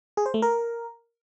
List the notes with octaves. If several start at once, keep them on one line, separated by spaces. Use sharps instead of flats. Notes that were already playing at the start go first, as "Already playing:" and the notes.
G#4
C5
A3
A#4